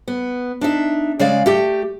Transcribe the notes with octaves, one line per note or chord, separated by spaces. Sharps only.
B3
D4 D#4 E5
C#3 G#3 D5 F5
A3 G4